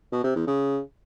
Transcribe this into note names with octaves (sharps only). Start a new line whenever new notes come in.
B2
C3
E2
C#3